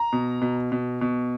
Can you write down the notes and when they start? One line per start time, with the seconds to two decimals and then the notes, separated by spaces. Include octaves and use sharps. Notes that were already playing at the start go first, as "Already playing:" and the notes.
Already playing: A#5
0.13 B2
0.42 B2
0.72 B2
1.01 B2